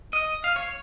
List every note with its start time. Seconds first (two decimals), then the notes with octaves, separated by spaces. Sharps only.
0.13 D#5
0.44 F5
0.56 C#5